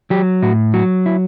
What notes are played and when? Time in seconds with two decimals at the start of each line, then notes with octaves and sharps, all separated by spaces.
0.10 F#3 G4
0.42 A2 F#4
0.74 F#3 F#4
1.06 E4